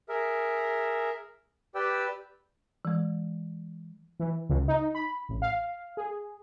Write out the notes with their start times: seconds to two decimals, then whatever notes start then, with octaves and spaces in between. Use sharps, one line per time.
0.09 G#4 A#4 E5
1.75 G4 B4 D5 G5 E6
2.85 E3 G#3
4.20 E3
4.49 C#2
4.68 D#4
4.95 B5
5.29 A1
5.42 F5
5.97 G#4